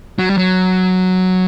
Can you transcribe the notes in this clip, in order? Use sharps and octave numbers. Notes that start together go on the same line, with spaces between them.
F#3
G3
F#3